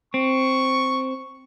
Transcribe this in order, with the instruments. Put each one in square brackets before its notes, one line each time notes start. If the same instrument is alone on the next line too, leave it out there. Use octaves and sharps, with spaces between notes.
[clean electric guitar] C4 [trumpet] C#6